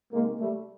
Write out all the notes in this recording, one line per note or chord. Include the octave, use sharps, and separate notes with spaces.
C3 D#3 G#3 A#3
G3 A3